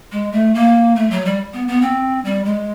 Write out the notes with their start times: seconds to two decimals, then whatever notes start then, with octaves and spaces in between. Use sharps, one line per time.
0.12 G#3
0.32 A3
0.55 A#3
0.96 A3
1.11 F#3
1.25 G3
1.53 B3
1.68 B3
1.82 C4
2.25 G3
2.45 G#3